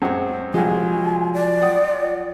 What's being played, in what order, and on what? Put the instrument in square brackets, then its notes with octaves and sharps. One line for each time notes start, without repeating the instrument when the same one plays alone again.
[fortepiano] F#2 G#3 C4 [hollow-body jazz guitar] C#4 C#5
[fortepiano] C2 G#3 [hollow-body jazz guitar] F3 F#3 [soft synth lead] F4 [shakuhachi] G#5
[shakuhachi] D5
[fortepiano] F#5 G5 D#6